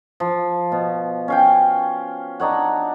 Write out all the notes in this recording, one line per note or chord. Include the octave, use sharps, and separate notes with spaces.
F3
B2
C#4 F5 G5
D4 D#4 C#5 F#5